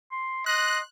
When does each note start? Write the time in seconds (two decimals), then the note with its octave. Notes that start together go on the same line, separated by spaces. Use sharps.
0.12 C6
0.46 D#5 C6 F#6